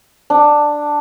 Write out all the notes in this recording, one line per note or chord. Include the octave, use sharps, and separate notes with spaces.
D4